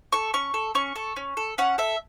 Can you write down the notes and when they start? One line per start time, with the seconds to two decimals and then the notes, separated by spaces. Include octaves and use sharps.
0.12 A4 C#6
0.34 C#4 C#6
0.54 A4
0.75 C#4 C#6
0.96 A4
1.16 C#4
1.37 A4
1.58 C#4 F#5
1.78 A4 E5